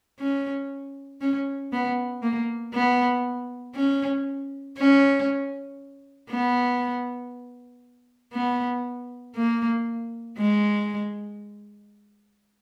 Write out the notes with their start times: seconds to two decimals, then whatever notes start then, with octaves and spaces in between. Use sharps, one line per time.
0.19 C#4
1.21 C#4
1.72 B3
2.22 A#3
2.74 B3
3.75 C#4
4.78 C#4
6.30 B3
8.34 B3
9.35 A#3
10.37 G#3